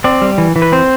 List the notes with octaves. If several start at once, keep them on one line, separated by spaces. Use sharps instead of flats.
C4 D5
G3
E3
E3
B4
C4 C5